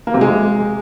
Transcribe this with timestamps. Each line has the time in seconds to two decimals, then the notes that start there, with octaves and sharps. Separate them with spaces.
0.07 A#3
0.14 C3
0.21 G#3